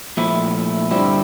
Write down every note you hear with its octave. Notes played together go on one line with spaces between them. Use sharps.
A#2 F3 A3 E4
G2 D3 G3 C4 E4